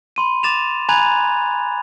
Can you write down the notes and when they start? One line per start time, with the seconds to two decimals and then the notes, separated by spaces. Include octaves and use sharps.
0.16 B5 C6 D#7
0.43 D6 A6 E7 F7
0.89 G#5 A#5 B5 F#6 G#6 F7